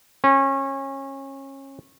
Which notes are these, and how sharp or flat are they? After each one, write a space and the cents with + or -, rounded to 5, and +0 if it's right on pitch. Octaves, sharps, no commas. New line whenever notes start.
C#4 -25